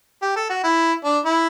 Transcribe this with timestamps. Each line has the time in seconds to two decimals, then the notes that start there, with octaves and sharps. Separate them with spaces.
0.22 G4
0.36 A4
0.50 F#4
0.64 E4
1.04 D4
1.25 E4